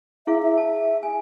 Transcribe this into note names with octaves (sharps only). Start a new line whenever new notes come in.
E4 G#4 E5 F5
E5
A5
G#4 G#5